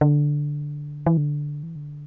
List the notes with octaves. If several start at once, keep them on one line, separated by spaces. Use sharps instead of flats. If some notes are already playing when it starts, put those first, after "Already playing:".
D3
E3
D3
E3
D3